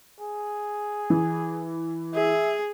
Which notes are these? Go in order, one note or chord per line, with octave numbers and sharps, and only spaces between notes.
G#4
E3
G#4 E5